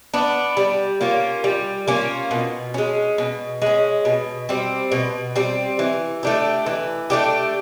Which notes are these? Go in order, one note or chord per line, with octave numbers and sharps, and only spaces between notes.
B3 D4
G3
A#3 C#4 F4
G3
A#3 C#4 F4
B2
G#3 C#4
B2
G#3 C#4
B2
G3 C4
B2
G3 C4
E3
A3 D4 G4
E3
A3 D4 G4